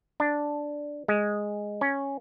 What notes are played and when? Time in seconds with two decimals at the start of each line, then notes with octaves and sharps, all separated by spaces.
0.20 D4
1.08 G#3
1.81 C#4